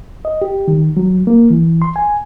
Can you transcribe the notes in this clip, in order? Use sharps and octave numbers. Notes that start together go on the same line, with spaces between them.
D#5
G4
D#3
F#3
A#3
E3
C6
G#5